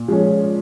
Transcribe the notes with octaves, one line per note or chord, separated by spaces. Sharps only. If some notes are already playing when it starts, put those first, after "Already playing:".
Already playing: A#2
F3 G#3 C#4